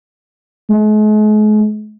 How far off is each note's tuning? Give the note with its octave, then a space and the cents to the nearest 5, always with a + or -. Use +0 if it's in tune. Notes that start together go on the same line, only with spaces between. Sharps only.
G#3 +45